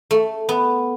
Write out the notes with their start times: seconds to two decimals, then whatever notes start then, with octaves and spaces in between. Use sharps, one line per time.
0.11 A3
0.49 B3